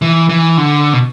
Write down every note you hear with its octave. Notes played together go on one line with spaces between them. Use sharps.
E3
E3
D3
B2